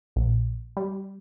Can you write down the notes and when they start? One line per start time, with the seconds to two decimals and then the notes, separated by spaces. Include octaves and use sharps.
0.16 A#1
0.77 G3